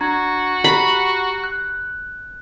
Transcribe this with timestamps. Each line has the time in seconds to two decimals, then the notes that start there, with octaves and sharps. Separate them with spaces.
0.01 D4 F#4 A#5 G#6
0.64 G4 A#5 B5 C7
1.44 F#6